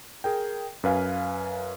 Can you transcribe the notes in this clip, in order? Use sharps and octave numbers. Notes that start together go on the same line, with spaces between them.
G#4 A#4 G5
F#2 B4 F5 G#5